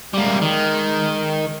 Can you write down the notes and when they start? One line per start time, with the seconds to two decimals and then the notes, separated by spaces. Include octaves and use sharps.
0.13 G3 G#3 A#3
0.42 D#3